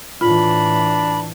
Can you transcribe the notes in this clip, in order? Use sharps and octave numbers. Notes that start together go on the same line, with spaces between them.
A2 E3 D4 F4 B5